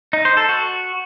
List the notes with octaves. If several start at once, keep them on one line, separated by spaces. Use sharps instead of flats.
D#4
C5
A4
F#4